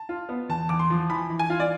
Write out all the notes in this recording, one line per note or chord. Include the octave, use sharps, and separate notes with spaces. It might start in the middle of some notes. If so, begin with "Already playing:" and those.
Already playing: A5
F4
B3
E2 A5
E2 D6
C6
F3
E3 B5
E3
G#5
F4
D5